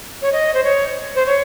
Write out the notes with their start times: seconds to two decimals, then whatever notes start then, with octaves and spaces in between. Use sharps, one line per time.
0.22 C#5
0.33 D#5
0.54 C5
0.64 C#5
1.15 C5
1.26 C#5